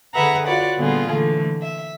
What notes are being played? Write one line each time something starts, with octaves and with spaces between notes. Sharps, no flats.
D3 G#4 B4 E5 F#5 A#5
F4 F#4 B4 C#5 D5 F#5
A#2 D3 G3 B3 F4 G#4
D3 E3 A3
E5